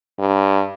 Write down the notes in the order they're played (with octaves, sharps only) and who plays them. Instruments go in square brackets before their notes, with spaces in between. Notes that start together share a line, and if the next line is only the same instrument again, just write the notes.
[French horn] G2